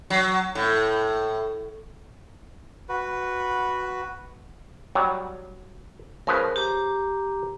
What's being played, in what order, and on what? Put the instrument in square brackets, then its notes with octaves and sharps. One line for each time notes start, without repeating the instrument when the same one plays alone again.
[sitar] F#3
A2
[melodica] F#4 B4
[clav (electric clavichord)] F#3 G3
[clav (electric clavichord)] C#3 F3 B4 [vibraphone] A#4
[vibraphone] G4 A#5 D6